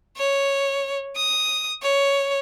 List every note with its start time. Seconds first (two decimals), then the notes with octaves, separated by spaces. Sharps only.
0.17 C#5
1.16 D#6
1.82 C#5